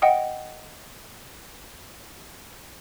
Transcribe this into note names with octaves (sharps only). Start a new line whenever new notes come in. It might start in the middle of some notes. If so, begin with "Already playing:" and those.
D#5 F#5 G5 D#6